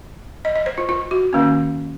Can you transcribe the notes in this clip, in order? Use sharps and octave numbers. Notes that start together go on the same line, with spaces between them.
D#5
D#5
C5
F4
F4
F#4
D#3 A#3 C#4